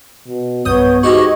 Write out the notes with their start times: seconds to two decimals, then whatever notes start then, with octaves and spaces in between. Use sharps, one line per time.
0.27 B2
0.65 B1 G2 B3 C#5 D#6 G6
1.03 G#2 F#4 G4 D#5 C#6 D#6 G#6